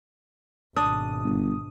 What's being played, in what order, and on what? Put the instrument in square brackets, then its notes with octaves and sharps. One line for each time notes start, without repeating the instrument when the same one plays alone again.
[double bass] G#1 B2 [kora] D4 [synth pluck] D#6
[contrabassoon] G1